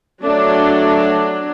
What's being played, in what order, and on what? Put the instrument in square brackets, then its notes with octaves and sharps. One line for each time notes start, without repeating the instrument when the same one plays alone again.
[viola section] F#3 D4 [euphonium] A3